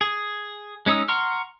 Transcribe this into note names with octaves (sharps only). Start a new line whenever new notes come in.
G#4
G#3 C#4 D#4 D#6 E6
F#5 A#5 C6 C#6 F6